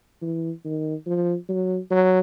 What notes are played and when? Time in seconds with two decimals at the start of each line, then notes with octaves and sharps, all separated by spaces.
0.22 E3
0.65 D#3
1.06 F3
1.49 F#3
1.91 F#3